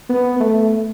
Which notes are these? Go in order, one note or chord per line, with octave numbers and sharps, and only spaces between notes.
B3
A3